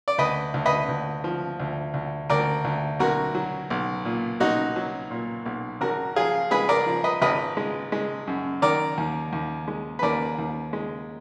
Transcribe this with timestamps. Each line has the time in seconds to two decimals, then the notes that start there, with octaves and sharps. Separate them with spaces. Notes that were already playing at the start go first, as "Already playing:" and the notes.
0.08 D5
0.18 D2 B4 D#5
0.54 D2
0.66 B4 D#5
0.89 D2
1.24 F3
1.60 D2
1.94 D2
2.30 D2 A#4 D5
2.65 D2
3.00 B1 F#4 A#4
3.35 F#3
3.70 B1
4.05 A#2
4.40 B1 D#4 F#4
4.76 F#3
5.11 A#2
5.46 B1
5.81 G#1 F#4 A#4
6.16 F3 F4 G#4
6.51 G#3 G#4 B4
6.69 A#4 D5
6.86 F3
7.04 B4 D#5
7.22 G#1 B4 D#5
7.57 G#3
7.92 G#3
8.27 F#2
8.62 D#3 A#4 D5
8.98 D#2
9.33 D#2
9.68 G#3
9.99 B4
10.03 D#2 A#4 D5
10.39 D#2
10.73 G#3